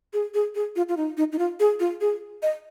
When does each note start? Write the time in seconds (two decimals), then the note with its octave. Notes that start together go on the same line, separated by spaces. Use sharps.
0.13 G#4
0.34 G#4
0.55 G#4
0.76 F4
0.89 F4
0.97 D#4
1.17 D#4
1.32 D#4
1.39 F4
1.60 G#4
1.80 F4
2.01 G#4
2.43 D#5